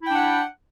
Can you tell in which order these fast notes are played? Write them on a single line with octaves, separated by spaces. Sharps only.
E4 G5 D4 F#5